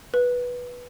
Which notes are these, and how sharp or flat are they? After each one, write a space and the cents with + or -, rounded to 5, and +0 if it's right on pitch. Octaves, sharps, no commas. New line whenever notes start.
B4 -10